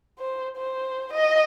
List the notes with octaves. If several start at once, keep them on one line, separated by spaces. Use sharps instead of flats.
C5
C5
D#5